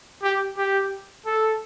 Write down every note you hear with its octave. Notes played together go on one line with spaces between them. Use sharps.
G4
G4
A4